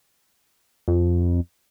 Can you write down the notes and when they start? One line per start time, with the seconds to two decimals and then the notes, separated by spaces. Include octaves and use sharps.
0.88 F2